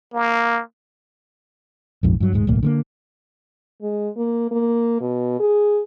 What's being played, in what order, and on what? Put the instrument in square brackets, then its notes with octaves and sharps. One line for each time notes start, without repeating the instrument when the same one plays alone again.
[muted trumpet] A#3
[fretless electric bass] A#1 F2 G#2
G2 F#3
D#1 G#2 G#3
D1 B1 A2 A#3
D3 A3 A#3
[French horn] G#3
A#3
A#3
B2
G#4